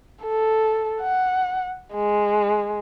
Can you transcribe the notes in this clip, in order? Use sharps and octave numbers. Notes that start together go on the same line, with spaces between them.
A4
F#5
G#3